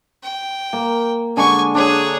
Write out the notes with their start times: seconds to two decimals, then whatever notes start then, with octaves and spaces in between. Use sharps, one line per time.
0.24 G5
0.73 A#3
1.37 D3 G#3 D4 G#5 C#6
1.75 D4 G#4 C#5